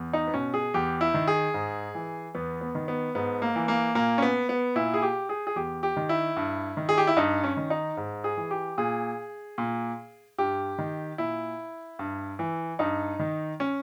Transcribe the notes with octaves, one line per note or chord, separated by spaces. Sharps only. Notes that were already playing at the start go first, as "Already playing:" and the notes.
Already playing: E2
D#4
B3
B2 C#4
G#4
E2 G4
E4
D#3
G#4
G#2
E3
E2 B3
B3
D#3
B3
G#2 B3
A#3
E3
A#3
A#2 A#3
C#4
B3
B3
A#2 E4
G#4
G4
G#4
G#4
E2 G4
G4
D#3
E4
G2
D#3
G#4
G4
E4
G2 D#4
C#4
D#3
D#4
G#2
G#4
E3
G4
A#2 G#4
A#2
G2 G4
D#3
A#2 E4
G2
E3
G2 D#4
D#3
C#4